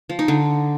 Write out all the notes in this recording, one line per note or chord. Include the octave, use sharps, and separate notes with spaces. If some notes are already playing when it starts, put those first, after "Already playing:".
F3
D#4
D3